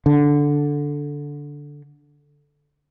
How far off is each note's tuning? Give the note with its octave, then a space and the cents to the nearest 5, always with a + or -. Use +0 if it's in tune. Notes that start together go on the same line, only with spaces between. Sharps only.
D3 -10